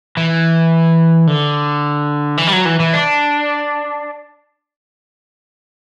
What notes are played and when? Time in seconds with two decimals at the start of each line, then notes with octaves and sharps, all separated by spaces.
0.17 E3
1.27 D3
2.38 E3
2.48 G3
2.53 F#3
2.66 E3
2.80 E3
2.94 D4